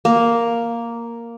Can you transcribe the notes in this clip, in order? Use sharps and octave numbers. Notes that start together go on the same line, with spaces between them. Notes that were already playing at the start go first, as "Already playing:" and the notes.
A#3